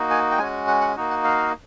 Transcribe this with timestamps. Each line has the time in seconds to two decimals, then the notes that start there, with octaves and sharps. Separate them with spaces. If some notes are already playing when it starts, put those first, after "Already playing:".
Already playing: A#3 D#4 F#4
0.10 G#5
0.31 G5
0.38 G#3 C#4 F#4 G#5
0.67 F#5
0.81 F#5
0.96 A#3 D#4 F#4
1.10 F#5
1.24 F5